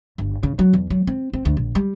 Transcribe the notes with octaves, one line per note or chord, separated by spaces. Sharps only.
G1
C#3
F#3
E2
F#3
C4
C4
D2
A#1
G3